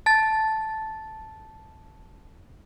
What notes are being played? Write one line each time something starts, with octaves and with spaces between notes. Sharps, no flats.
A5 A6